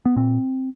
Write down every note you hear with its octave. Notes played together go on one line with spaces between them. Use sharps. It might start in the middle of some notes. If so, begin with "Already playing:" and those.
B3
A#2 C4